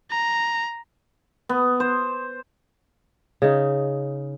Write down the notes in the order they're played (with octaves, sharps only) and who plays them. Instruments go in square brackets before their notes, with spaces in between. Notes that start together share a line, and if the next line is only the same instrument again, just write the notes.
[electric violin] A#5
[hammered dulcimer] B3
C5
[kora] C#3 D#4